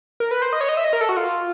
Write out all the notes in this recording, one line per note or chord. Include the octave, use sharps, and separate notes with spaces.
A#4
B4
C5
D#5
C#5
D#5
E5
D#5
A#4
A4
F#4
F4